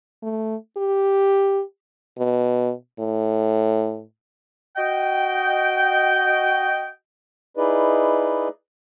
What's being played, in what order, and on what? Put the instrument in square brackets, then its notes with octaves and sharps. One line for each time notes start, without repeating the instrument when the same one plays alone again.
[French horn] A3
G4
[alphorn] B2
A2
[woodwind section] F#4 D#5 G5
[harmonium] D#4 E4 G#4 B4 D5 D#5